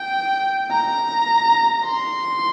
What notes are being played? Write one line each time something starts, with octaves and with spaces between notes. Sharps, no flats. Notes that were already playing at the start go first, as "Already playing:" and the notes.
Already playing: G5
A#5
C6